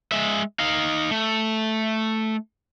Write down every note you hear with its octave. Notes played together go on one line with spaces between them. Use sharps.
G#3 E5
D#4 F5
A3